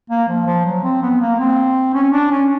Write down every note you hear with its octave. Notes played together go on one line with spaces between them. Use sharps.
A#3
F3
F3
F#3
C4
B3
A#3
C4
C#4
D4
C#4